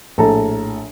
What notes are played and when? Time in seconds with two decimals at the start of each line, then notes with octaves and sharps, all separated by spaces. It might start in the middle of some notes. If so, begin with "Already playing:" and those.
0.18 A#1 A2 A4 A5 A#5